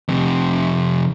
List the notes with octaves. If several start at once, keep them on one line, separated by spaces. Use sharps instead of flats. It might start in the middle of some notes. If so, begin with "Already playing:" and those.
F2 C3